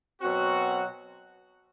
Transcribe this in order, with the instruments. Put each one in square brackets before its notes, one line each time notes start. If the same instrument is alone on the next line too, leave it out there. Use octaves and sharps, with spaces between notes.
[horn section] B2 F#3 C4 F#4